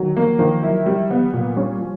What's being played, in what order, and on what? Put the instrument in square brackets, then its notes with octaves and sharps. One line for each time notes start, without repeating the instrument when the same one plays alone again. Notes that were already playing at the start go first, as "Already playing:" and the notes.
Already playing: [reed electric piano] D3 D#3 [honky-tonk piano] F#3
[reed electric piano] F3 [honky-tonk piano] A#3
[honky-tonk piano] D#3 [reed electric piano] F3
[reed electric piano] F#3 [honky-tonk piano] E4
[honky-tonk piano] G3
B3
A#2
[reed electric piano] G3 [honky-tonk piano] C#4
[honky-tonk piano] F3